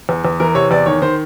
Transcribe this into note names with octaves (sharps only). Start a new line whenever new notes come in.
E2
E2
E3 A#4
C3 C#5
E2 D5
D#3 C#5
D#3 C5